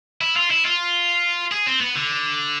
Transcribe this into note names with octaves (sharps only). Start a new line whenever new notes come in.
E4
F4
E4
F4
G#4
C4
B3
D3